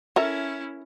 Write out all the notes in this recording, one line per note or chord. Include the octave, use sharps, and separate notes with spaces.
C#4 E4 A4 A#4 E5